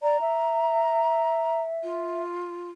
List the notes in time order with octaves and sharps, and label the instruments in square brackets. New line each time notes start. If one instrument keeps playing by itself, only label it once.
[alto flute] D5 [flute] A#5
[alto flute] E5
[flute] F4